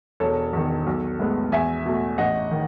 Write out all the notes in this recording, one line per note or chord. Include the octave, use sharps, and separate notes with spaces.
E1 A4 C#5
E2 D#3
B1
A2 G#3 B3
E2 E5 G#5
B2 A3
A1 D#5 F#5
D#3